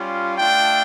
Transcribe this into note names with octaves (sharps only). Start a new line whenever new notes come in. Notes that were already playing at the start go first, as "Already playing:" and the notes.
Already playing: G3 C#4 F4
A3 D4 F4 G5